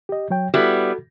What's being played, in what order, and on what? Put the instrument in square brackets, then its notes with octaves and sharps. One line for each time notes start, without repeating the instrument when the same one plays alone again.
[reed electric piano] G4 D#5
F#3 C#5 G5
[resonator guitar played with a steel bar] G3 B3 E4 [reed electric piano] F#4 A4